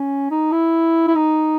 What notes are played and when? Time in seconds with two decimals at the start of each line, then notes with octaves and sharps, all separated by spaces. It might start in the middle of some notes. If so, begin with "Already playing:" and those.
Already playing: C#4
0.31 D#4
0.52 E4
1.08 E4
1.15 D#4